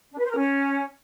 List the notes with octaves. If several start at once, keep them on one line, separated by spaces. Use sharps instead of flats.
D4
B4
C5
A#4
C#4